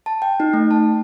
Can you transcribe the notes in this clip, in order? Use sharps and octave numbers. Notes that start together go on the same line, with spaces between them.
A5
G5
D#4
A3
A5